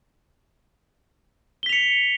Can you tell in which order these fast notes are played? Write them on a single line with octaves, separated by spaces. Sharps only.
G7 B6 F7 C#7